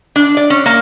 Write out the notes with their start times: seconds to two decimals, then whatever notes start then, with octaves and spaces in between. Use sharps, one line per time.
0.16 D4
0.37 D5
0.50 C#4
0.66 A#3